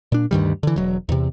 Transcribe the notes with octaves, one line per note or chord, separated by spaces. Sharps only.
A#2 D4
D2 G2 D#3 G3
D3 E3
E1 F#3
E2 C3